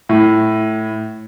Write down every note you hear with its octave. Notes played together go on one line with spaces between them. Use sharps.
A2